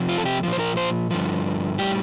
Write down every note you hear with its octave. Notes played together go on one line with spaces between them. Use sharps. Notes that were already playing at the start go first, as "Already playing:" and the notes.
Already playing: F2 C3 F3
F4
A4
G4
A#2 F3
C5
A#4
C5
G2 D3 F3
A2 G3 G4